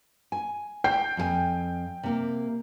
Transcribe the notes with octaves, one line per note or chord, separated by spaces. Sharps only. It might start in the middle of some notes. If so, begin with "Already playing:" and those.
G#5
G5 G6 C7
F2 A4 G#5
C3 A#3